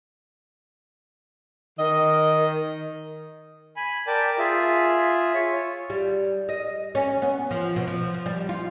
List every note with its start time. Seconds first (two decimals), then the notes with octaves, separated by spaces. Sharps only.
1.78 D#3 D#5
3.76 G#5 B5
4.07 A#4 D5 G5 A5
4.38 F4 G#4 E5
5.34 F4 C#5
5.90 G3
6.49 D#5
6.95 C#4
7.22 B3
7.51 F3
7.76 B2
7.88 F3
8.14 F3
8.26 G3
8.49 F4